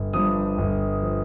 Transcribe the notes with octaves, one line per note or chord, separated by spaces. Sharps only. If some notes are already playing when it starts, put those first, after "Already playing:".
Already playing: G1
G2 F3 D#6
G1
F3